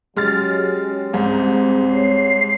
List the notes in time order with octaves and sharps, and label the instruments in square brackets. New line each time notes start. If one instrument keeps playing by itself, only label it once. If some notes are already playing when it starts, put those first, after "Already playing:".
[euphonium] F#3 [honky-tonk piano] G#3 F6 A6 [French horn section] C#4 G4
[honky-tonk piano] C2 G#2 [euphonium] C4
[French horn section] C#5 [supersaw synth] C7